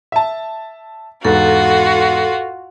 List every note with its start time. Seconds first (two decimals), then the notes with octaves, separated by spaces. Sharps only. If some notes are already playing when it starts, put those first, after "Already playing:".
0.12 E5 A5
1.25 E2 G#2 F4 F#4 A4